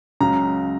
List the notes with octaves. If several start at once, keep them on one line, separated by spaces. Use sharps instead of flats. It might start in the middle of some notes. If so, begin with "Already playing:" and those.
C#2 C#3 F#3 A#5